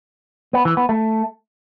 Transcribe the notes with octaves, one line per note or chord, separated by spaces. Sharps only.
B3
E3
B3
A3